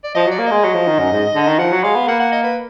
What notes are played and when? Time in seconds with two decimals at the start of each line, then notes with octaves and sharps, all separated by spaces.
0.04 D5
0.15 F3 D#5
0.27 F#3 D5
0.38 A#3
0.46 G#3 D#5
0.64 F#3
0.75 F3
0.87 D#3
0.99 F#2
1.12 G#2
1.35 D3
1.47 D#3
1.59 F3 F#5
1.72 F#3
1.84 G#3 F5
1.95 B3
2.08 A#3 F#5
2.20 F#5
2.32 D#5
2.43 B4